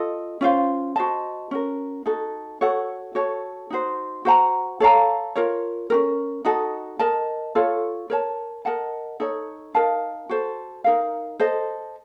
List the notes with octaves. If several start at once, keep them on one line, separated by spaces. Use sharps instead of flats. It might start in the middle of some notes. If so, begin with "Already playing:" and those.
Already playing: F4 A4 D#5
C#4 F4 C5 F5
F#4 C5 D#5 A5
C#4 F#4 A#4
D#4 F#4 A4
F#4 A4 C#5 F#5
F#4 A4 C#5
D#4 F#4 C5
F#4 C5 F#5 A#5
A4 C#5 F5 A#5
F4 A#4 C#5
C#4 F#4 A#4
D#4 F#4 A4 D#5
A#4 D#5 A5
F4 A4 C#5
A#4 C#5 A5
A#4 D#5 F#5 A5
D#4 A4 C#5
D#4 A#4 F5 A5
F#4 A4 C5
D#4 A#4 F5
A4 C5 D#5